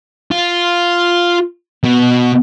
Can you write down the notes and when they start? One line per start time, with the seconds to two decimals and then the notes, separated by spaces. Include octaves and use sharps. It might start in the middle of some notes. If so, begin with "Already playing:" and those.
0.31 F4
1.84 B2